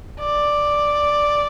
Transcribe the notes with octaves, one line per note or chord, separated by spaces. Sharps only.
D5